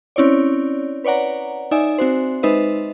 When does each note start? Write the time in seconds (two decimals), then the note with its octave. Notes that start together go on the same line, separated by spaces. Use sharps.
0.16 C4 C#4 E4 C#5 D5
1.04 B4 C#5 D5 F#5 A#5
1.71 D#4 D5 E5 G#5
1.98 C4 F#4 C5
2.43 G#3 D#4 B4 C5 D#5 E5